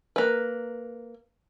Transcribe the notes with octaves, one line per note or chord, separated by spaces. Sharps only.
A#3 B4